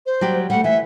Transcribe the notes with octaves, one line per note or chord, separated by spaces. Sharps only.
C5
F#3 G3 G4
G3 A3 F#5
E3 E5